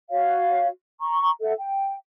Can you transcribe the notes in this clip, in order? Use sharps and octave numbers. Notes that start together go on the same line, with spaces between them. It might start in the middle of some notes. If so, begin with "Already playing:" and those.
F#4 C#5 F5
A#5 C#6
A4 E5 F#5
G5